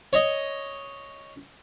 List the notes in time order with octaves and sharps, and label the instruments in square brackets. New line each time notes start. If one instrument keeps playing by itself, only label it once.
[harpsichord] C#5 D#5